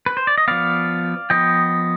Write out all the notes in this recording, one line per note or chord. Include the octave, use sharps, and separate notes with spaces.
B4
C5
D5
D#5
F3 B3 D5 F5
F3 B3 D#5 G5